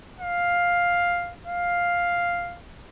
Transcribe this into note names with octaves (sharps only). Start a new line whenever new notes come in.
F5
F5